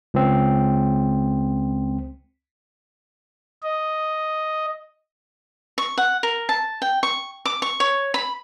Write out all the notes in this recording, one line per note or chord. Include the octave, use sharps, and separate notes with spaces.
C#2 C4
D#5
C#6
F#5
A#4
A5
G5
C#6
D6
C#6
C#5
B5